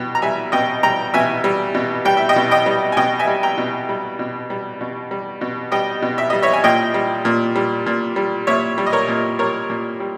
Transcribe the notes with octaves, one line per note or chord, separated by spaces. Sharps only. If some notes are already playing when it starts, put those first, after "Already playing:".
Already playing: B2 G3 G5
A#5
G3 E5 G#5
B2 D#5 G5
G3 G5 A#5
B2 E5 G#5
G3
B2
G3 G5
E5
D#5 G5
B2
D#5 G5
G3
G#5
B2 D#5 G5
E5 G#5
G3
G5 A#5
B2
G3
B2
G3
B2
G3
B2
G3 D#5 G5
B2
E5
G3 D#5
C#5 E5
G#5
A#2 D#5 G5
G3
A#2
G3
A#2
G3
A#2 C#5 E5
G3
D#5
A#4 C#5
A#2
G3 A#4 C#5
A#2
G3